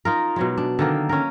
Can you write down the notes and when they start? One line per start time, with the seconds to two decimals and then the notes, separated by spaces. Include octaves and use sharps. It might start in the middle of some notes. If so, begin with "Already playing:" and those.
0.05 D#4 F4 A#4
0.36 B2 F#3 G#3
0.58 D4
0.79 D3 D#3 A#3
1.09 C#4 A#4